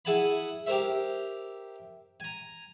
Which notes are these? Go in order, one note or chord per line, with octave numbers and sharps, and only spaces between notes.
E4 G#4 F#5 G#5 A5 B5
G4 A#4 C5 E5
G#5 A#5